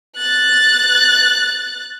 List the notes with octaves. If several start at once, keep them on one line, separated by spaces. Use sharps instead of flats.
F#6 A6